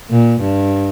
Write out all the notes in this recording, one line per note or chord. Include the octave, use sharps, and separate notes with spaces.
A#2
G2